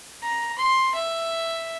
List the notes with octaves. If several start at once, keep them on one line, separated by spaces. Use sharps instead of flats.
A#5
C6
E5